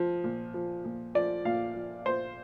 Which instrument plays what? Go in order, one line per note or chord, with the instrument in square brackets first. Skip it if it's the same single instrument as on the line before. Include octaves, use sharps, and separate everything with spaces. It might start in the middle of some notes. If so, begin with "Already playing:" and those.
Already playing: [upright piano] F3
A#2
F3
A#2
F3 D5
A#2 F5
F3
A#2 C5